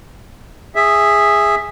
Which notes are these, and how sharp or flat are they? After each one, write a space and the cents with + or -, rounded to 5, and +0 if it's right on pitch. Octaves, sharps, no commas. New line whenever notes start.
G#4 -10 E5 +0